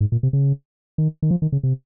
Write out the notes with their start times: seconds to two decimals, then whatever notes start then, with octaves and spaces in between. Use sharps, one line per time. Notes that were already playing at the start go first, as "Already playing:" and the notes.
0.01 G#2
0.12 A#2
0.23 C3
0.33 C#3
0.98 D#3
1.22 D#3
1.31 F3
1.42 D#3
1.52 C#3
1.63 C3